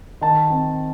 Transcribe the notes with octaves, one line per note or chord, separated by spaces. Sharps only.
D#3 A5
C4